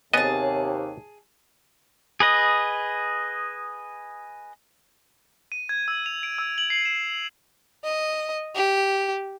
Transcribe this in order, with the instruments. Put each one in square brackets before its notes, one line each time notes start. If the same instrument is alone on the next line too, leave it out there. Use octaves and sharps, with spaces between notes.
[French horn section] D#2 C3 C#5 [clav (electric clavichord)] B3 D#5 [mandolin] G#4 A5
[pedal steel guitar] G#4 B4 D#5
[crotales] D#7
G#6
E6
F7
D7
E6
F#7
C7
E7
[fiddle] D#5
G4